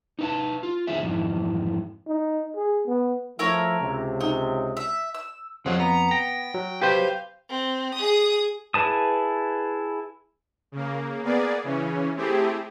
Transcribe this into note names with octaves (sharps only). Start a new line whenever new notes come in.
D#4 B4 A5
F4
D#3 F#3 C4 D#4 G#4 E5
F2 G#2 D#3 E3
D#4
G#4
B3
F3 A3 E4 A#4 C#5
C#2 C3
D#4
E5
E6
F2 F3 F#3 F#4 G#4
B3 A#5
G5 A#6
F#3
G4 B4 C5 F5
C4
G#4 D#6
E4 G#4 B4 A5 D#6
C#3 A#3
A#3 B3 G#4 D5
C#3 E3 C#4
A3 C4 E4 G4 G#4